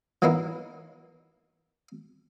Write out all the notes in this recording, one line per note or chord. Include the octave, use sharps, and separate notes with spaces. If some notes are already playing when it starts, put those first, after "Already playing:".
E3 F#3 A#3 B3 D#4 E4